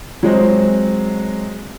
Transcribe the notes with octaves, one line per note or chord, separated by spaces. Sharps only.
F#3 G#3 C4